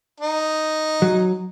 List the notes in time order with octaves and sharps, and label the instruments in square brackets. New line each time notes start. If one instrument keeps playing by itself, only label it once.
[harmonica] D#4
[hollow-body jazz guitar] F#3